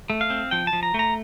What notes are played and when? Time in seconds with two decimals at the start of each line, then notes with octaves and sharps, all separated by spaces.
0.10 A3
0.21 F5
0.30 C4
0.51 F3 G5
0.67 A5
0.73 F3
0.83 A#5
0.94 A3 A#5